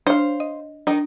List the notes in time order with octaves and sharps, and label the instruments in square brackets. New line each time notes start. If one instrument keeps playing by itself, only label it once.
[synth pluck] D4 C#5 [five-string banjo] C5 F5
[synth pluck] D#5
[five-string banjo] D#3 D#4 [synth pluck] D4